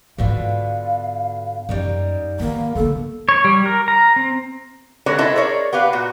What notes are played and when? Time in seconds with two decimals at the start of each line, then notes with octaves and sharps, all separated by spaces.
0.18 G#2 B2 D3 B3 F4 F5
1.69 F#2 G3 A#3 D#4
2.40 D#3 A#3 B3
2.75 D3 A#3 A4
3.29 C#5
3.44 G3
3.66 A#4
3.88 A#5
4.16 C4
5.06 D3 G#3 A#4 B4 C#5
5.18 C#4 E4 A4 C5 D#5 E5
5.36 G#4 A#4 C#5 D5
5.73 B3 G4 B4 F5
5.93 A#2 F#4